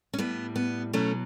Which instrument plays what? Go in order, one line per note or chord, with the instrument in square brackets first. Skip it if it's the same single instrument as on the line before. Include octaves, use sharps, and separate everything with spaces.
[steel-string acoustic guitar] C#4
A2 G3 B3
B3
B2 F#3 A3 C#4